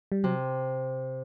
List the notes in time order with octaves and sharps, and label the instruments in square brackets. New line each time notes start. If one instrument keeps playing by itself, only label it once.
[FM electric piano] G3
[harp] C3 [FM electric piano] F#3